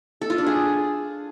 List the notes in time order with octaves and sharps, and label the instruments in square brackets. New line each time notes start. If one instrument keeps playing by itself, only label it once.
[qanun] A4
F4
D4
G#4